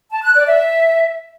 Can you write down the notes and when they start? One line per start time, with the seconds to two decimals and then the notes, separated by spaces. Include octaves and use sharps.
0.12 A5
0.23 F#6
0.35 D5
0.46 E5